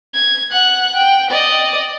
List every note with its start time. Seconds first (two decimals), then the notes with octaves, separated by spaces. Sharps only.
0.14 G#6
0.51 F#5 F#6
0.95 G5
1.30 D5 D#5